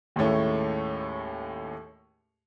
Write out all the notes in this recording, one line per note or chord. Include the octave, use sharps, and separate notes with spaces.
D#2 A2 G#3 A3 C#4